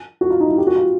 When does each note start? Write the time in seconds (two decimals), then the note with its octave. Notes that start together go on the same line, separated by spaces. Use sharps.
0.21 F#4
0.30 F4
0.40 D#4
0.50 E4
0.58 G4
0.67 F#4
0.76 F4